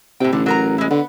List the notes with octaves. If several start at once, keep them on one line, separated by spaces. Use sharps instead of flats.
A2 C3 G5
A1 D3
F#3 A#4 A#5
G#3 E4
D3 B3